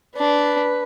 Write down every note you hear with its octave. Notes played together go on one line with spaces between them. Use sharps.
D4 B4